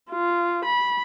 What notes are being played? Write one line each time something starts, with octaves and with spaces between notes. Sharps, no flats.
F4
B5